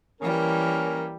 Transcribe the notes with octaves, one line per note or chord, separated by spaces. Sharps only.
E3 G3 A#3 C#4 A#4